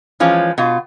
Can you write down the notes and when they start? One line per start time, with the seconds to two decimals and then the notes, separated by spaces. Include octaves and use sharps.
0.20 E3 F3 G#3 C#4
0.58 B2 F4